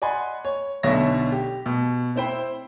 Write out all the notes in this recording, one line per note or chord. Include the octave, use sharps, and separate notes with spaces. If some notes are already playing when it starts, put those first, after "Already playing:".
D5 D#5 F#5 G#5 B5 C6
C#5
B1 B2 D3 C#5 E5 A#6
G4
B2
C4 E4 C5 G5 B5